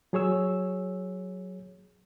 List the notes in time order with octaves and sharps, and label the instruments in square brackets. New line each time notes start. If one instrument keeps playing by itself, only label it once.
[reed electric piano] F#3 G#4 C#5 E6